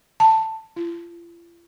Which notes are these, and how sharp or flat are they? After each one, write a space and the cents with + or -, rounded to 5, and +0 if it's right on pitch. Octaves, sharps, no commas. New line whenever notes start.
A5 +10
F4 -45